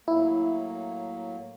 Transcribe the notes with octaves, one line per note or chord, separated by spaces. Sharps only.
A2 F#3 A#3 E4